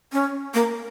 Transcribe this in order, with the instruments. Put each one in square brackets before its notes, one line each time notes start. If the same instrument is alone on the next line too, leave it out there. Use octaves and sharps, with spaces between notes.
[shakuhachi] C#4
A#3